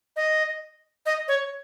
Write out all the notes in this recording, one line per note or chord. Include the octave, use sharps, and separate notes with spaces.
D#5
D#5
C#5